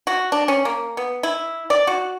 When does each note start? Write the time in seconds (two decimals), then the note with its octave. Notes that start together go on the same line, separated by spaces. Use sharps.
0.07 F#4
0.32 D4
0.48 C#4
0.65 A#3
0.97 B3
1.23 E4
1.70 D5
1.87 F#4